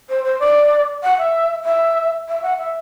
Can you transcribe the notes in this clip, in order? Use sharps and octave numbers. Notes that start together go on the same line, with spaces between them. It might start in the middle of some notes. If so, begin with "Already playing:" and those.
C5
C5
D5
F#5
E5
E5
E5
F#5
E5